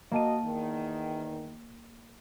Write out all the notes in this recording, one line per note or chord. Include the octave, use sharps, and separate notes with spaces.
A#3 F#4 D#5 A5 D#7
E2 D#3